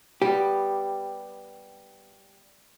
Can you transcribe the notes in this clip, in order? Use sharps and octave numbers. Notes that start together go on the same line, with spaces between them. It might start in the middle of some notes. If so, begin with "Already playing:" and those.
G3 B3 G4